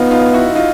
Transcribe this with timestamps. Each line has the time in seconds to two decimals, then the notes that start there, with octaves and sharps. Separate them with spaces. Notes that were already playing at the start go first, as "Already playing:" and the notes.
Already playing: B3 D#4 F4
0.11 D#4 F4
0.33 E4 F#4
0.55 D#4 F4